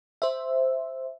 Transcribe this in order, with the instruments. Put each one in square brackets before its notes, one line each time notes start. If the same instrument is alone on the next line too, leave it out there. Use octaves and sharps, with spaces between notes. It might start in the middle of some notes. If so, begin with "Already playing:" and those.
[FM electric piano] C5 E5